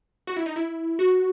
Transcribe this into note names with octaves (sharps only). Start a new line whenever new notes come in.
F#4
E4
D#4
E4
F#4